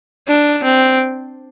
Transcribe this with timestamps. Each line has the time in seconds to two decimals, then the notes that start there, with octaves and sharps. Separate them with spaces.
0.27 D4
0.63 C4